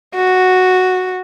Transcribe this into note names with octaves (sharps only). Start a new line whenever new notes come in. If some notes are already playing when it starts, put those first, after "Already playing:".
F#4